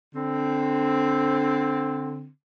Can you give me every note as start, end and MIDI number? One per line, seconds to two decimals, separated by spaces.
0.15 2.27 50
0.15 2.27 60